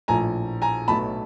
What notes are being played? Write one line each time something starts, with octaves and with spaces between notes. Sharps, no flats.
A#1 A2 F3 A3 G#5 A#5
G#5 A#5
B1 B2 F#3 A3 A5 B5